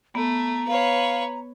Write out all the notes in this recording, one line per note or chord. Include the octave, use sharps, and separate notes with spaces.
A3 B3 A#5
B4 C#5 F5